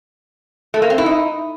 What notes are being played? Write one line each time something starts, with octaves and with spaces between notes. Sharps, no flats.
A3
A#3
C4
E4
D#4